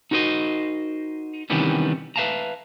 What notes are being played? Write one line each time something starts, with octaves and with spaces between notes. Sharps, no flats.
D#4 F#4 A#4 C5 D#5
C3 D#3 E3 G3 B3 C#4
B4 E5 F5 A5 A#5